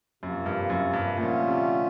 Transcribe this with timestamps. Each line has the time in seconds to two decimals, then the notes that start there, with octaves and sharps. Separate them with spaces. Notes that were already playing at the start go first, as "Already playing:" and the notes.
0.23 F#2 C3 F3 A#3
0.46 G2
0.70 F#2
0.93 G2
1.17 A#2 D3 F3 A3 C#4 F4
1.48 C3